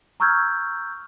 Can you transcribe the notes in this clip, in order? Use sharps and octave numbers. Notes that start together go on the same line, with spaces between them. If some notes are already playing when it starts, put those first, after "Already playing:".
A#5 C#6 E6 F6 G6 G#6